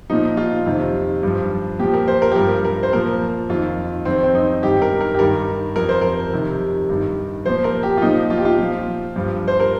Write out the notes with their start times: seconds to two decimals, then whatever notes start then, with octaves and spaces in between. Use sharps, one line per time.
0.10 A#2 F3 D#4
0.37 F4
0.66 F2 C3 D#3
1.23 G2 F3
1.79 A#2 F3 G4
1.94 A#4
2.08 C5
2.22 A#4
2.32 G4
2.35 G2 F3 A#4
2.65 A#4
2.83 C5
2.93 A#2 F3 A#4
3.49 F2 D#3 F4
4.05 F2 D#3 C4
4.24 C4
4.35 D#4
4.62 G2 D#3 G4
4.82 A#4
5.01 A#4
5.15 G4
5.19 G2 D#3 A#4
5.75 F2 F3 A#4
5.89 C5
6.01 A#4
6.33 F2 C3 D#3
6.89 G2 D#3
7.46 A#2 F3 C5
7.64 A#4
7.83 G4
7.97 F4
8.02 A#2 F3 D#4
8.30 F4
8.38 G4
8.45 F4
8.59 A#2 F3
9.16 G2 F3
9.48 C5
9.60 A#4